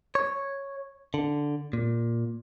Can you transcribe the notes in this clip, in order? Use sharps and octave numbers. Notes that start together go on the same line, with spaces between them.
C#5
D3
A#2